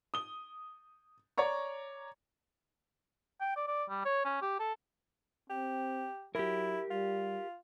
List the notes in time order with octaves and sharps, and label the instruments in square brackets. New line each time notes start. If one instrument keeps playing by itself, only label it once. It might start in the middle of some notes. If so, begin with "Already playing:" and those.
[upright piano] D#6 G7
C#5 D5 A#5 C#6
[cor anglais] G5
D5
D5
G3
C#5
C#4
G4
A4
[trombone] C4 [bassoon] G4
[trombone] F#3 [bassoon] E4 [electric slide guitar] G4 A#4
[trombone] G3 [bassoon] F4